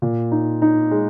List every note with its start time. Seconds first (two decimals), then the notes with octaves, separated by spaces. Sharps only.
0.02 A#2
0.32 D#4
0.62 D#4
0.91 G#3